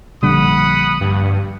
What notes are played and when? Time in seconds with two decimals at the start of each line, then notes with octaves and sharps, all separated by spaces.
0.23 A#1 D3 G3 F#5 B5 D#6
1.01 G2